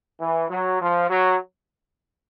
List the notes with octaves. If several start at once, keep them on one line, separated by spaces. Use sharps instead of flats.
E3
F#3
F3
F#3